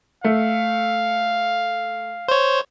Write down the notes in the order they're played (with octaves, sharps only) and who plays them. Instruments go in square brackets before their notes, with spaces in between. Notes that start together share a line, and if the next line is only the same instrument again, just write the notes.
[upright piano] A3 [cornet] F5
[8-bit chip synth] C5 C#5